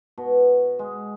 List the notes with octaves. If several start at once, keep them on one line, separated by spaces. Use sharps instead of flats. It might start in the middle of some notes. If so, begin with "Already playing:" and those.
B2
G#3